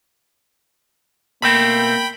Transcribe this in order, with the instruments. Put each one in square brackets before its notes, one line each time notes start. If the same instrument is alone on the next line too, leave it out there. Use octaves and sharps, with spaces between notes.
[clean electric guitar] B2 A3 C4 [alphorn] A#3 [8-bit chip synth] G5 B5